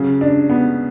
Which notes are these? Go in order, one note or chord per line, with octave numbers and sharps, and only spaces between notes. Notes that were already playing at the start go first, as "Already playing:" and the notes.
Already playing: C#3 F#3
D4
B3